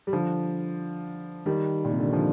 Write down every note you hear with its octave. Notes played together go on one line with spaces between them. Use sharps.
G3
D3 F3
D#3 G3
A#2
C3
D3
D#3
D3 F3